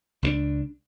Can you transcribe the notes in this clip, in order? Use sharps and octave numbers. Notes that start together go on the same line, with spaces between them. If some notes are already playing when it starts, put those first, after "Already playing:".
C#2 A3 D4